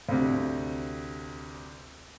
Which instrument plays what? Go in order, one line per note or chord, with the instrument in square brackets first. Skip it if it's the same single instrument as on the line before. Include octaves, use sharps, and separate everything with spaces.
[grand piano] D2 C3